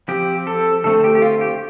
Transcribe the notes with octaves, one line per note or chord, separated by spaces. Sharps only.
F3 C4 G4
A4
D3 A3 C4 A4
G4
G4
F4
G4